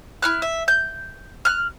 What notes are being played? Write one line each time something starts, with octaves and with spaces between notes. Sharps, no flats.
E4 F6 F#6
E5
G6
F6 F#6